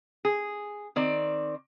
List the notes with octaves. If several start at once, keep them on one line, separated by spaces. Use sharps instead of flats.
G#4
D#3 C4 D5